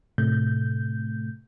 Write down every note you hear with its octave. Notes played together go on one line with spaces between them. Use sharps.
A2 C3 A3 G6